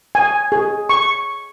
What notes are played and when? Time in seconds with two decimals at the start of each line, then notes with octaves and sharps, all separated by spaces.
0.15 G#5
0.52 G#4
0.89 C#6